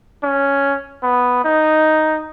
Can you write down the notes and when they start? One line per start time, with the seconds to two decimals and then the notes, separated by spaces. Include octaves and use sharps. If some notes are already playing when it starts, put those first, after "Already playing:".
0.23 C#4
1.03 B3
1.45 D#4